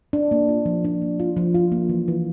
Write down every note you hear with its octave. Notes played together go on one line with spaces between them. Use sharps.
D4
A#3
F4
F3
D4
A#3
F4
F3
F4
A#3
E3
E3